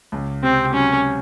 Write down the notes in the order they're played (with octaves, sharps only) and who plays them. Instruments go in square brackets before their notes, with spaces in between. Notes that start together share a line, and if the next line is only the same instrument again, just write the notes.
[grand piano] C#2
[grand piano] C3 [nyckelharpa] C4
[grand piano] F#3 [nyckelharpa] C#4